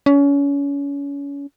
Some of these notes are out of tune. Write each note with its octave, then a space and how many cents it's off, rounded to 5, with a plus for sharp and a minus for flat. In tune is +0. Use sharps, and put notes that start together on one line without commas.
C#4 +30